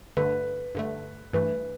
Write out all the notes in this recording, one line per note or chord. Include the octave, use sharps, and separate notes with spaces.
G2 D3 A3 B4
G2 D3 A3
G2 E3 A3 B4